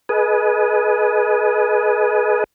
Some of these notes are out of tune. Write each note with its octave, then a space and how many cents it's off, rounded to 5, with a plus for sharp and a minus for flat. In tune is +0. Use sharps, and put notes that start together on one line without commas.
G#4 +30 B4 -20 D#5 -5